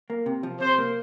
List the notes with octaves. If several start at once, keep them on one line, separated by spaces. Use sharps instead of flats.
A#3
C3
F3
C3 C5
A#3